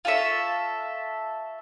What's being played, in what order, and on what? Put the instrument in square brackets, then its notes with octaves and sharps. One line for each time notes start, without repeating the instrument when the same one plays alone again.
[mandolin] F4 A4 C#5 E5